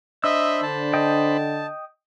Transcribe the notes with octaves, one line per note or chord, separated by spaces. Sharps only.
D4 C5 D#5 E5 B5 E6
D3 A5
D#5 G5